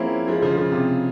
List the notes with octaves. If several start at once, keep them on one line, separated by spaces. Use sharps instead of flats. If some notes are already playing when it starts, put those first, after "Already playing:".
Already playing: F3 G#3 A#3 C4 C#4 E4
F3 G#3
C#3 F3
C#3
C3